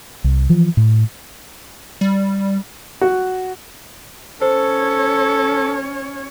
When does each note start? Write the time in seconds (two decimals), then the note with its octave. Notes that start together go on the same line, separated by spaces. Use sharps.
0.24 C2
0.49 E3 F3
0.77 A2
2.01 G3
3.01 F#4
4.42 C#4 A4 C5 C#5